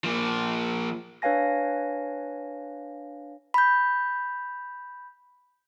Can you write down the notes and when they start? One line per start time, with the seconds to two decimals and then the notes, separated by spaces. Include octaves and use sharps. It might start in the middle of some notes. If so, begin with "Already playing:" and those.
0.04 F3 A#3
1.22 D4 B4 C#5 F5 G#5 A#6
3.54 B5 G6